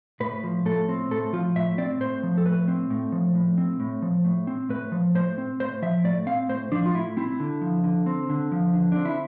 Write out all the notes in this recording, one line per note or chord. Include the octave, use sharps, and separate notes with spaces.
A2 B4
F3
A2 A4
C4
A2 A4
F3 F4
A2 E5
C4 D5
A2 C5
F3
A4
A2 B4
C4
A2
F3
A2
C4
A2
F3
A2
C4
A2 B4
F3
A2 C5
C4
A2 C5
F3 E5
A2 D5
C4 F5
A2 C5
F3 D4
F4
A2 E4
C4 E4
D3
F3
D3
C4
D3
F3
D3
C4 D4
E4